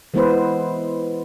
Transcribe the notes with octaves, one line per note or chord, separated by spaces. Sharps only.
E3 G#3 B3 E4 B4 C5